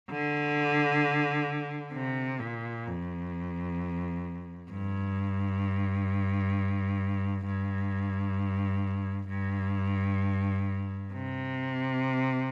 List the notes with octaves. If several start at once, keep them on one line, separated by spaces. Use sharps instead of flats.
D3
C3
A#2
F2
G2
G2
G2
C3